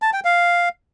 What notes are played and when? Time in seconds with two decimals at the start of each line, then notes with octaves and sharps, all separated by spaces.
0.02 A5
0.13 G5
0.25 F5